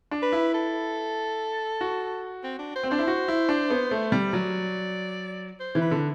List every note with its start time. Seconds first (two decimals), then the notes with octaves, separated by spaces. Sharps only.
0.11 D4
0.23 B4
0.33 E4
0.54 A4
1.81 F#4
2.44 C4
2.59 D4
2.76 C5
2.83 C4
2.91 D4 C5
2.99 E4
3.08 F#4
3.28 E4
3.49 D4
3.70 B3
3.91 A3
4.12 G3
4.33 F#3 D5
5.60 C5
5.75 E3
5.81 B4
5.91 D3